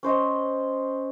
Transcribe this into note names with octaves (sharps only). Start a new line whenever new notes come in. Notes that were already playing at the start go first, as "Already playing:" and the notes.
C#4 C5 D#5